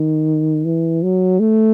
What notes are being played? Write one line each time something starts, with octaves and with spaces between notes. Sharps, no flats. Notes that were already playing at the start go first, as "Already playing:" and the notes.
Already playing: D#3
E3
F#3
A3